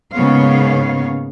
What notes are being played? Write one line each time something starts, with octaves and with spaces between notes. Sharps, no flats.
G#2 C#3 A#3 B3 C#5 F5